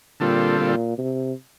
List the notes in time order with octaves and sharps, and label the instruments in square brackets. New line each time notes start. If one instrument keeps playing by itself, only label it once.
[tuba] A#2 [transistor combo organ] D3 G3 C4 F4 A4
[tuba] A#2
C3